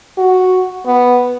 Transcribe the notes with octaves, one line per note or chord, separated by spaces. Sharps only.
F#4
B3